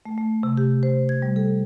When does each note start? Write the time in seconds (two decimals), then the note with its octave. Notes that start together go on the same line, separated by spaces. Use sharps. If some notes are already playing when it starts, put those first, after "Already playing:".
0.06 A3
0.18 A3
0.43 C3
0.57 G4
0.83 C5
1.09 G#6
1.22 G3
1.36 A4